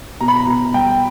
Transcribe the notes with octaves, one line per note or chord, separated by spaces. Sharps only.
B2 A#5
B5
A#5
B2 A#5
G3 G5